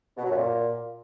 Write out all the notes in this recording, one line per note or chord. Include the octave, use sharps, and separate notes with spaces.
B2
F#3
F#2
A#2